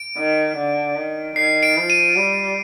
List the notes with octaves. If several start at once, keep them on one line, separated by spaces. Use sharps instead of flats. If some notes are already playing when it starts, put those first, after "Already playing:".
Already playing: D7
D#3
D3
D#3
D#3 C7
D7
F3
D#7
G3